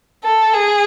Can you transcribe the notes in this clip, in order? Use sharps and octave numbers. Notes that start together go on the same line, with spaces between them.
A4
G#4